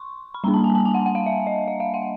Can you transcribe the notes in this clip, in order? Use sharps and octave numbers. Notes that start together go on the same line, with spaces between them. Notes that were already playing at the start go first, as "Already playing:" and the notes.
Already playing: C6 C#6
B5
G3 A#3 D4 A#5
A5
G#5
A5
G#5
F#5
F#5
F5
E5
D#5
E5
F5
F#5